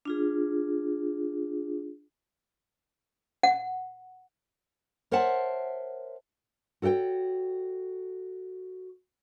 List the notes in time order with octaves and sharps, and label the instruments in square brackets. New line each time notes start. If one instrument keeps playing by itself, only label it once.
[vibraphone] D4 F4 G#4
[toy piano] F#5
[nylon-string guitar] A#4 C5 C#5 E5 F#5 A5
F#4 A4 C#5 F#5 G5